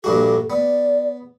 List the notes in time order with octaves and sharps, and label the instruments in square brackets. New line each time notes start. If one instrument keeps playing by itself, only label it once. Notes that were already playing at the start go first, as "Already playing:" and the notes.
[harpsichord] A#1 G2 F#4 [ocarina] A4
[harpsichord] B3 [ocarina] D5